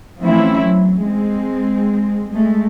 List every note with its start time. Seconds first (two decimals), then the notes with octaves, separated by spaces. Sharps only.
0.21 E3 F3 A3 C4 C#4 E4
0.62 F#3
1.02 G#3 C4
2.31 G#3 A3